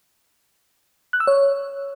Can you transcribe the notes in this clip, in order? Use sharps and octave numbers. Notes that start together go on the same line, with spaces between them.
F#6
E6
C#5